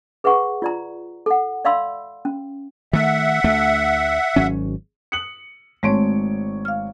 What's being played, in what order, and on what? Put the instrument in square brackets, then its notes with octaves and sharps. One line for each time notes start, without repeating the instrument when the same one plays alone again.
[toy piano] G#4 B4 E5 F#5 C#6
F4 D5 A#5
A4 F#5
D5 E5 F5 B5 C6 E6
C#4
[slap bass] D#3 A3 [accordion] E5 F#5
[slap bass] D2 A3
G#1 F#3 C#4
[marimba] D#6 F#6 [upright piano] C#7 F#7
[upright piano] G#1 C#5 D7 [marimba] G#3 A3 C4
[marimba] F5 F6